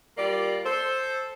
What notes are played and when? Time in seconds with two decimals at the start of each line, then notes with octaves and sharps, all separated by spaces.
0.18 G3 A#3 F4 D5
0.65 A4 C5